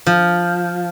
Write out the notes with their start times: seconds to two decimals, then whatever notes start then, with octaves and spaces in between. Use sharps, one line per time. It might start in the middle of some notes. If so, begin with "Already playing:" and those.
0.06 F3